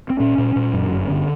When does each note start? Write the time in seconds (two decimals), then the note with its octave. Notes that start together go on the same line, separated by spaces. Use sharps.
0.10 C4
0.20 A#2 C#4
0.38 A#2
0.56 A#2
0.73 F#2
0.91 G1
1.09 D3